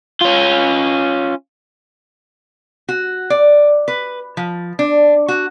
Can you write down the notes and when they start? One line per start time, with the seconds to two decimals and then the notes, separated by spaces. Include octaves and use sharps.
0.21 C#4 F4
2.89 F#4
3.30 D5
3.88 B4
4.37 F3
4.79 D4
5.29 F#4